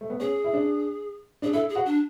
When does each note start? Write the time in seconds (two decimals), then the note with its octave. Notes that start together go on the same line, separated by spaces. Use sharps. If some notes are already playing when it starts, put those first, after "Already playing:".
0.01 A3
0.10 B3
0.20 C#4 G#4
0.44 E4
0.53 D4
1.42 D4 G#4
1.53 E4 A4
1.69 G#4
1.76 F#4
1.86 D4